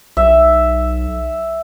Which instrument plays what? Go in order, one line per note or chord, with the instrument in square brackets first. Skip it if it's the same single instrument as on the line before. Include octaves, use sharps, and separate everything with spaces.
[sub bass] B1 [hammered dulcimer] E5